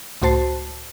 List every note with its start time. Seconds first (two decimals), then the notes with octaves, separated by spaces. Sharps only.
0.22 C#2 A2 F#4 C5 A5 C7